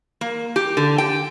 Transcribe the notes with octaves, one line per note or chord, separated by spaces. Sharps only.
A#3
G4
D3
G5